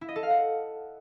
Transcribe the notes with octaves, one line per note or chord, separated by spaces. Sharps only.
E4
D#5
A4
F5
F#5